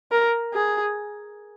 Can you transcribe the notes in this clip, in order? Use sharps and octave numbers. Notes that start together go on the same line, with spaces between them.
A#4
G#4